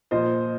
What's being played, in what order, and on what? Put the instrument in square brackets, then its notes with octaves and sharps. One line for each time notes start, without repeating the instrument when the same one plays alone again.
[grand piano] A#2 F3 C5 D#5